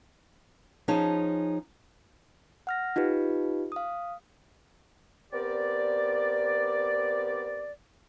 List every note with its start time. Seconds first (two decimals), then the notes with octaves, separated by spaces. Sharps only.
0.88 F3 C#4 D#4 G#4 C#5 A5
2.67 F#5 F6 A#6
2.96 D#4 F4 G4 B4
3.72 F5 D#6
5.33 B3 C4 G4 A#4 D5